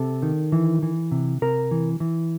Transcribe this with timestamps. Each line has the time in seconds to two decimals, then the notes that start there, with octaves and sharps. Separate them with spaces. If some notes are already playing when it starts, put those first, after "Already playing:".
Already playing: C3 A4
0.23 D#3
0.52 E3
0.83 E3
1.12 C3
1.42 C3 A#4
1.71 E3
2.00 E3